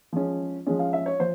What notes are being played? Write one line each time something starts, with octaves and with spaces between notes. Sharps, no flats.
F3 G#3 C#4
F3 G#3 C#4
F5
E5
C#5
F3 C5